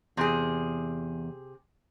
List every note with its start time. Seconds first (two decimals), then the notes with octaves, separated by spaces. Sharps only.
0.17 E2 C3 G#4